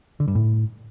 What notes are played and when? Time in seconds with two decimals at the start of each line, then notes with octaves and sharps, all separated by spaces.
0.20 D3
0.28 G2
0.35 A2